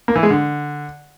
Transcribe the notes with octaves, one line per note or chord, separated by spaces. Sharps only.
A#3
E3
G#3
D3